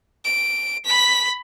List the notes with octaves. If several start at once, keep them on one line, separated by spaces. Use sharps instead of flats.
D7
B5 B6